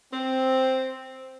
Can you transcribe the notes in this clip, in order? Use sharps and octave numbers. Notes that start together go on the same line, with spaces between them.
C4